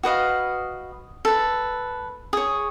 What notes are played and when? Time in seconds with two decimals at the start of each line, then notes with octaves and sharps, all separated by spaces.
0.03 F#4 B4 D#5 F5
1.25 A4 B4
2.33 G#4 C#5